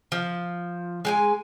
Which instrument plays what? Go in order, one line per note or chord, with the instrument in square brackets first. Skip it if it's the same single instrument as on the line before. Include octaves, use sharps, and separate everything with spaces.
[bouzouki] F3
G#3 G5 G#5